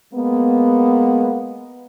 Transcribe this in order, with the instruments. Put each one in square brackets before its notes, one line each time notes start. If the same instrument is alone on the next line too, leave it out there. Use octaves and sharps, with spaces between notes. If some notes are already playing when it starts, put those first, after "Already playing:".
[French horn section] G#3 A#3 B3